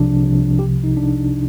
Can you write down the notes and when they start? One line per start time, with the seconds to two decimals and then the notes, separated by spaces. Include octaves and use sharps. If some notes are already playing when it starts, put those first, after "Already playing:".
Already playing: C2 C3 F3 D4
0.22 C2 C3 F3
0.59 C2 C3 F3 G4
0.84 D#4
0.97 C2 C3 F3 D4